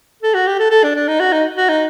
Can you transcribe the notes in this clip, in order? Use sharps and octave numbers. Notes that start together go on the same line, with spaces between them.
A4
F#4
G4
A4
A4
D4
D4
D#4
F#4
D#4
F#4
D#4